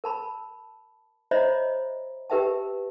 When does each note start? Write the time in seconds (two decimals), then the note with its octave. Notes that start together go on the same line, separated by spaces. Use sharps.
0.04 A#4 A5 B5
1.31 C5 C#5 D#5 E5 A#5 B5
2.30 G4 A#4 B4 E5 G5 A5